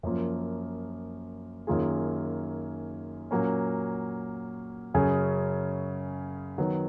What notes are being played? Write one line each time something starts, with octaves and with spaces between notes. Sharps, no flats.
F#2 F3 A#3
F#2 D#3 A#3 F4 G#4
A#2 F#3 A#3 C#4
F#2 C#3 F#3 C#4 G#4
D#3 F#3 B3